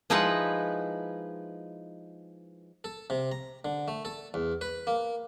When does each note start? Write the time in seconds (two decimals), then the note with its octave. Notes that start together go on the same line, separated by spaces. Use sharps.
0.10 F3 G#3 D#4 E4 B4 F#5
2.84 A4
3.10 C3
3.32 A#5
3.65 D3
3.88 A3
4.05 A4
4.34 E2
4.61 B4
4.87 A#3